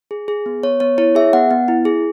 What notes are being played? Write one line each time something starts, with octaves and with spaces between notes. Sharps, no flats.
G#4
G#4
B3
B3 C#5
B3 C#5
E4 C#5
G#4 E5
B3 F#5
B3
E4
G#4